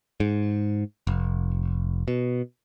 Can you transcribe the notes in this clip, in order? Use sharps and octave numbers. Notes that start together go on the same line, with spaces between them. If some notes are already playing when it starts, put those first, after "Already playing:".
G#2
F1
B2